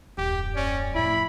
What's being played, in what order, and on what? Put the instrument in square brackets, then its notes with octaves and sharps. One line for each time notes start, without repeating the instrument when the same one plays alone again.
[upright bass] D#1 F#2 [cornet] G4
[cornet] C#4 [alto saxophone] D5
[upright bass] F2 A2 [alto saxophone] E4 [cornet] B5